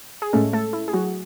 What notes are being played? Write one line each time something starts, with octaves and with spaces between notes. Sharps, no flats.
G#4
A2 G#3 A3 C#4 A4
A3 A4
E4
G#4
F#3 F#4